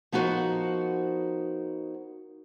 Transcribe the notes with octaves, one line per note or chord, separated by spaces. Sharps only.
F3 B3 D#4 F#4 A#4 C5